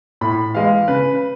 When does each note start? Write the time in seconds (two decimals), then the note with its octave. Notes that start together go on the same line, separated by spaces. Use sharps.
0.21 A2 B5
0.55 E3 G#3 F5
0.88 C#3 B4